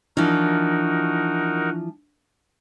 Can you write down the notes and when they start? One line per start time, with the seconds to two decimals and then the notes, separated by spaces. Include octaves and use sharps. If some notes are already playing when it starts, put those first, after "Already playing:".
0.17 E3 F3 D4 D#4 F#4 A#4